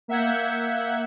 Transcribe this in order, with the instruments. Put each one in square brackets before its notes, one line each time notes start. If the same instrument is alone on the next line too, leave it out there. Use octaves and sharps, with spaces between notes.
[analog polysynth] A#3 E5 F#5 G6 G#6